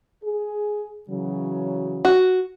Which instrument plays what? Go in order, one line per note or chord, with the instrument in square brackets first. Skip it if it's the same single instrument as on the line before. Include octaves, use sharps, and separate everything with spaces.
[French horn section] G#4
C#3 E3 F#3
[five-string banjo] F#4